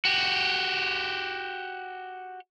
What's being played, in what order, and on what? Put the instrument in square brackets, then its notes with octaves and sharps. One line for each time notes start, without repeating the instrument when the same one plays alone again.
[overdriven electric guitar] F#4 G4